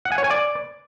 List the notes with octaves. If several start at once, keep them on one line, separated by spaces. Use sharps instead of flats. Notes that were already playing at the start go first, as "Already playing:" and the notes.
F#5
G#5
C#5
G#5
D5